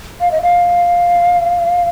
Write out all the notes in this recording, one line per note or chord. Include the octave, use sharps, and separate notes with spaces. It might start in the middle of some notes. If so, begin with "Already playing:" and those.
F5
D#5
F5